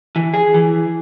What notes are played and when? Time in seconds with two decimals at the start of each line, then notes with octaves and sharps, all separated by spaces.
0.16 E3
0.34 G#4
0.54 E3